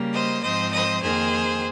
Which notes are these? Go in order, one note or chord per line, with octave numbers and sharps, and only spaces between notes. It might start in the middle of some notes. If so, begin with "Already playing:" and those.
Already playing: C#3 G3 A#3
C5 D#5
G#2 F3 C4 C5 D#5
C5 D#5
F2 D#3 A#3 G#4 C5